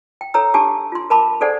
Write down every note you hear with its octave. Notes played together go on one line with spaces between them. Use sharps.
G5
A4 C#5 A#5 E6
D4 G4 G#5 A5 D6
F4 C6
A#4 A5 B5 D6
G#4 A4 C5 D5 F#5 G#5